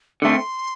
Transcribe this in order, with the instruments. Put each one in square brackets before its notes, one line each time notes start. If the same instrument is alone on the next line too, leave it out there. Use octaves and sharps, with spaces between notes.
[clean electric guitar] D3 A3 C4 [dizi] C6